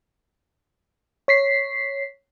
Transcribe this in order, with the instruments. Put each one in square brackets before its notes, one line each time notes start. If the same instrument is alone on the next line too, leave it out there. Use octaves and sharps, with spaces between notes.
[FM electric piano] C#5 B6 C7